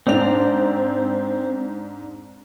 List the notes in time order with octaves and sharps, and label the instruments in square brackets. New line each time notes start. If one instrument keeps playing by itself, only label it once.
[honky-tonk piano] G#2 D4 F7 [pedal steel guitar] C4